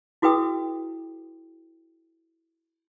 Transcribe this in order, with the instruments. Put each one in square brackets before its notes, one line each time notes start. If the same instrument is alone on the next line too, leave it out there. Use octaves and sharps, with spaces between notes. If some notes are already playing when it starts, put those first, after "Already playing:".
[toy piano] E4 F#4 G#4 B4 G5 D#6